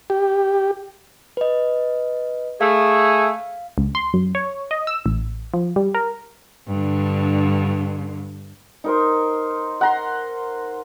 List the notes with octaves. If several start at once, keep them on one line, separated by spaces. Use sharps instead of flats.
G4
B4 D#5
A3 G#4 F5
C#2
C6
F#2
C#5
D#5
E6
A1
F3
G3
A#4
G2 D3
D#4 A#4 C5
F#5 A#5 C6